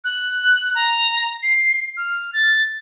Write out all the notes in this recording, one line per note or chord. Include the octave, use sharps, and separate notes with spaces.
F#6
A#5
C7
F6
A6